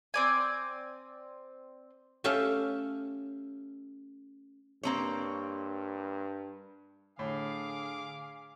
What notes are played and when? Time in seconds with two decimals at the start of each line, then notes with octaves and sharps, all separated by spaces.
0.14 C4 D5 G#5
2.24 A3 C#4 G4 A4 E5 F5
4.83 G2 A#3 C4 C#5
7.19 A2 D3 G#4 F5 D6